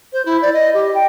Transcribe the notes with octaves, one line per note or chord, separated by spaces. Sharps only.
C5
E4
D5
D#5
G4
G5